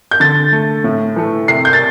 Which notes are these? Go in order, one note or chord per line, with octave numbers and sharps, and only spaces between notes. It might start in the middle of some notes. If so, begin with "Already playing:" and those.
G6
D3 A6
A3
A2
E3 A3
C3 C7
G6
A6